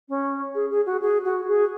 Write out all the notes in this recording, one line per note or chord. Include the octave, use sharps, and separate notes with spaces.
C#4
G#4
G#4
F#4
G#4
F#4
G#4